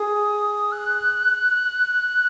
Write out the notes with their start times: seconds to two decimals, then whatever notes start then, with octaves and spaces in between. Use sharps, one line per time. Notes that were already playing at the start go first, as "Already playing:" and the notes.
Already playing: G#4 D#6
0.72 F#6